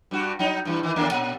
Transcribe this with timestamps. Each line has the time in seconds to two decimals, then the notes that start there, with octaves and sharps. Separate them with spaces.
0.11 G2 G3 F#4
0.39 F#3 D#4
0.65 G2 E3
0.83 D#3 E3
0.96 D#2 A#3 D4
1.11 A#2